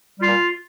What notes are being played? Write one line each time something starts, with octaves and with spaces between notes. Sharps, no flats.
G3 F4
A#2